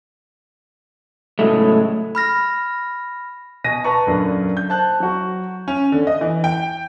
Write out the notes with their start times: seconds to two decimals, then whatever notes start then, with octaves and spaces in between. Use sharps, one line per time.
1.39 A2 C#3 F#3 G#3 A3
2.15 B5 F6 A#6
3.64 B2 G#5 A#6 D#7
3.84 B4 A5 A#5 C#6
4.07 F#2 A#2 D3
4.57 G6
4.69 C5 A5 F#6
5.00 F#3 F#4
5.68 C#4
5.92 D3
6.07 D#5
6.21 E3
6.44 G5